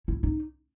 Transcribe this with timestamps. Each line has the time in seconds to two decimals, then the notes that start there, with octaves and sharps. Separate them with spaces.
0.08 E4
0.23 D#4